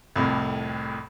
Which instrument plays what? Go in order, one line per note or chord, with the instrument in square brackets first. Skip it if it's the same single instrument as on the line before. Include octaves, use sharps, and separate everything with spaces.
[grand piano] C2 F2 A2